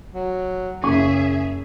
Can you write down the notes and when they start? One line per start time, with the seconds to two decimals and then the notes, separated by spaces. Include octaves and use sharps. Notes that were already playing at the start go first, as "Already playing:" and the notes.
0.14 F#3
0.83 F#1 C#3 G#4 E5 C#6